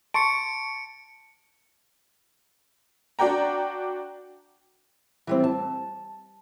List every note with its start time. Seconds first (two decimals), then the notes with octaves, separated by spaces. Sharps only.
0.14 A5 C6 C#6 C#7 D7
3.19 D4 F#4 D5 G5 A#5
5.27 E3 G3 C4
5.44 A5